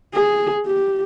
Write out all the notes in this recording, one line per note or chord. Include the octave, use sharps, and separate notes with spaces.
G#4
G4